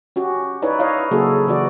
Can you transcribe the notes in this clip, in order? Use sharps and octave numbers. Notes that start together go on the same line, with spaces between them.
C#4 F#4 G4
D#4 E4 B4 C#5 D5
E4 C#5 D#5 F5
C#3 F#3 A#3 F#4 G#4 A4
C#3 E3 F#4 D5